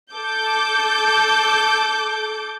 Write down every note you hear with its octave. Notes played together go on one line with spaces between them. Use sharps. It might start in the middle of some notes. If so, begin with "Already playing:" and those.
A4 D6 G6